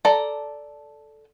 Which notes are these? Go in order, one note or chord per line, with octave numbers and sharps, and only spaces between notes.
A4 D5 A#5